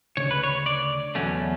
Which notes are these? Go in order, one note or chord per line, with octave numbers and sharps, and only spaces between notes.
D2 C#3 C#5
B4
C#5
D5
E2 B2 F#3 A3 C#4